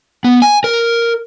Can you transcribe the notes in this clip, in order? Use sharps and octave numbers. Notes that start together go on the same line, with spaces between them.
B3
G#5
A#4